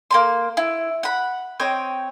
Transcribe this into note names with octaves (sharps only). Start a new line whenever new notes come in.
A#3 C4 C6
E4
F#5 B5
C4 C#5 D#5 G5